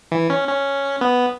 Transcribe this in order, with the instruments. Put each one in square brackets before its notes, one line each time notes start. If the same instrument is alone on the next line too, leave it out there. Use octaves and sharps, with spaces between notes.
[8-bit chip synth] E3
C#4
C#4
B3